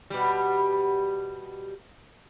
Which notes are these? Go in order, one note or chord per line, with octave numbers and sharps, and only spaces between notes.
B2 G3